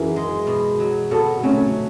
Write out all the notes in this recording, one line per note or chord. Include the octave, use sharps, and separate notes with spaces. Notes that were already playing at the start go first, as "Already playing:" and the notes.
Already playing: F#2 E3 E4 G#4
G#3
B2
F#3
B2 F#4 A4
F#3 A3 C#4